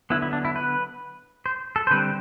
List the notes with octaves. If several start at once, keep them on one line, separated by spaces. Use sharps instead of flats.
D3 F#3 B3 E4
E4
D4
E4
B4
C5
A4
C5
D3 G3 C4 B4